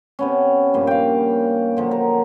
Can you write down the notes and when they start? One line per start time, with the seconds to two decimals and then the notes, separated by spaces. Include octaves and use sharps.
0.19 C3 B3 C#4
0.74 G2 A#2 F3
0.87 F5 G5
1.77 D3 F3 F#3
1.91 A#4